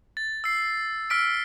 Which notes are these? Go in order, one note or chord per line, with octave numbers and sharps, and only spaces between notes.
A6
E6 C7
E6 F6 B6 D7